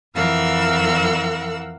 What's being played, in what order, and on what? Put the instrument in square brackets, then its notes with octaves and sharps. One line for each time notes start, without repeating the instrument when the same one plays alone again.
[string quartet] F2 E3 A#4 F5 F#5 E6